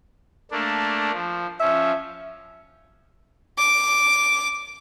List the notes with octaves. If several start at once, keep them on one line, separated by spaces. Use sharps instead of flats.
A3 A#3 D4
F3
F3 C#4 E5
D6